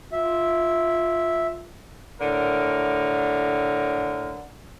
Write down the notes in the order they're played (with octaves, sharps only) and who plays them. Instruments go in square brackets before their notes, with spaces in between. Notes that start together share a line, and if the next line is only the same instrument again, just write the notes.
[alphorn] F4 [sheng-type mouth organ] E5
[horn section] A2 D3 A#4